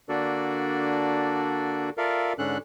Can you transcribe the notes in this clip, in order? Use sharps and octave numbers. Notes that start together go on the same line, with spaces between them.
D3 A#3 D4 F#4 A4 D5
F4 A4 A#4 D5 E5 F5
G#2 D3 C#4 D4 A4 F#6